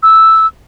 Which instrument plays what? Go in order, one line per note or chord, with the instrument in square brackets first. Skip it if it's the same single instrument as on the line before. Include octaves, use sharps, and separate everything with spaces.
[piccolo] E6